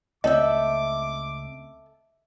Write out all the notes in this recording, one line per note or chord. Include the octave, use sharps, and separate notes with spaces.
C#2 A3 C4 A4 C#5 D#5 E5 D6